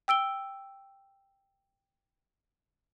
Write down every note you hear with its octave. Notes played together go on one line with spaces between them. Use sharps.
G5 E6 D7 G7